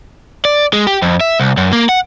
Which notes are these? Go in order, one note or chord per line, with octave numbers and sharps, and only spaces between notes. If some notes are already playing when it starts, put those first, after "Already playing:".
D5
G#3
G4
F2
E5
C2
F#2
A#3
F#5